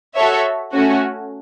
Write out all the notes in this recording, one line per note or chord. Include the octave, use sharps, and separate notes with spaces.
F#4 A4 C#5 E5
A3 C#4 F#4